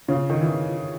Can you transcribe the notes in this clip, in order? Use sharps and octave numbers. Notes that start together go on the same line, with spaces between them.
C#3
D#3
E3